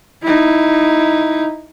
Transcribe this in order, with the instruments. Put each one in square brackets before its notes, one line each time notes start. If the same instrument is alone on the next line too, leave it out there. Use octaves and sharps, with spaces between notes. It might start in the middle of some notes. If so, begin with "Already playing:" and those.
[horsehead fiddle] D#4 E4